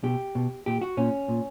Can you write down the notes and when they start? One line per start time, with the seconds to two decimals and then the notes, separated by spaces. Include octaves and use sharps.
0.03 B2 G4
0.35 B2
0.66 A#2 G4
0.82 F#4
0.97 A#2 C#4
1.28 A#2